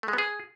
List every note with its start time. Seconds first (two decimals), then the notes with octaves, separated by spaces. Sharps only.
0.03 A3
0.08 G#3
0.13 B3
0.18 G#4